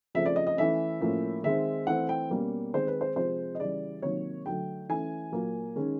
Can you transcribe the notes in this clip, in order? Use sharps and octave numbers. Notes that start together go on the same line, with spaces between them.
C#3 F3 A3 C4 E5
D5
D#5
D#5
E3 A3 C#4 E5
A2 F3 A#3 C#4
D#3 G#3 C4 E5
E3 A3 C4 F#5
G5
B2 G3 A#3 C#4
D#3 G#3 C4 C5
B4
C5
C3 F3 G#3 C5
D#5
C#3 E3 G3 D5
C3 D#3 F#3 A#3 C#5
D3 F#3 A3 G5
E3 A3 C#4 G#5
A#2 F#3 A#3
D#3 G#3 C#4